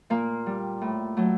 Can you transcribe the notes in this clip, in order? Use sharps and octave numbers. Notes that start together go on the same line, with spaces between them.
A#2 A#3
G3
A2
F#3 A3